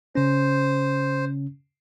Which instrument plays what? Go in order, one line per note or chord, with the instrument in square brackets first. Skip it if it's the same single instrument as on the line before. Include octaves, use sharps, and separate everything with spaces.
[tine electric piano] C#3 C#4 [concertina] C5